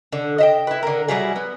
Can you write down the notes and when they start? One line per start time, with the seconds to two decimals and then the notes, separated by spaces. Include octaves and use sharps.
0.12 D3
0.38 D#5 E5 G5
0.67 E4 B4
0.83 D3 A#4
1.08 F#3 G3 E4 G#4
1.36 B3